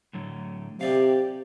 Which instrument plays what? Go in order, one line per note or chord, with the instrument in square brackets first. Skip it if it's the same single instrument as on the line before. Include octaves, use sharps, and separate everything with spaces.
[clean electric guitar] A2 D3 F#3
[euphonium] C3 [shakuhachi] G4 [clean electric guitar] D5 F5